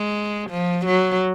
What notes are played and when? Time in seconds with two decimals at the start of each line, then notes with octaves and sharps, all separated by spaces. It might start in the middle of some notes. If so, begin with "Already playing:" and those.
Already playing: G#3
0.50 F3
0.85 F#3